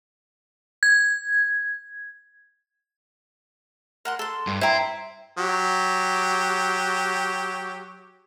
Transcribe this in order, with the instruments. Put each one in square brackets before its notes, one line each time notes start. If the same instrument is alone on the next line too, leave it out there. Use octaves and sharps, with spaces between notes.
[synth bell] G#6
[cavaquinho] A#4 F#5 C6
A4 C6
[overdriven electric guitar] G2
[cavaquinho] E4 A#5 [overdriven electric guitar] C5 G5
[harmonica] F#3 G4